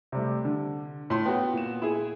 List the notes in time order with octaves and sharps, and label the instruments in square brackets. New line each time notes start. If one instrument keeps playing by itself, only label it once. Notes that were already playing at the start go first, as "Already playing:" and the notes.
[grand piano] C3 G3 A3
D3
[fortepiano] A2 C6
[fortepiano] B3 F#4 [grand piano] G5
[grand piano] A#2 E7
[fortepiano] E4 G#4